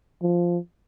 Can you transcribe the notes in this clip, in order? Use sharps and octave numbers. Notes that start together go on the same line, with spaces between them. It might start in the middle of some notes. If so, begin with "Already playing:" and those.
F3